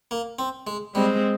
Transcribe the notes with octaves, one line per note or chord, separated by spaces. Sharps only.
A#3
C4
G#3
G3 G#3 C4